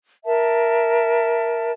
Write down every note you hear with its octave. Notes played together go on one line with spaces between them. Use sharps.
A#4 E5 A5